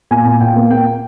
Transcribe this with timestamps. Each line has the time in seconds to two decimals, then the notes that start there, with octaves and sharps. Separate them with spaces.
0.11 A#2 G#5
0.26 A#2
0.40 A#2 G5
0.56 A#3
0.71 A#3 G5